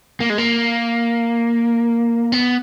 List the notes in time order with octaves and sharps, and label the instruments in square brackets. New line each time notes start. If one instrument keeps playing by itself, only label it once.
[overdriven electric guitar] A#3
G#3
A#3
B3